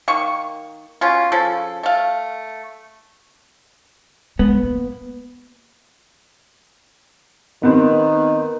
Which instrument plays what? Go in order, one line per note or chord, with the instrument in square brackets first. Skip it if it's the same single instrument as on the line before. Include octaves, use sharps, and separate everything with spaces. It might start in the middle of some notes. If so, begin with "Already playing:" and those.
[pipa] D#3 A#3 C#6
B2 C#4 F4
C#3 F3 A4
A3 F5
[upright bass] G#3 [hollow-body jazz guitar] B3
[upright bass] A#3
[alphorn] D#3 [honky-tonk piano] B3 C4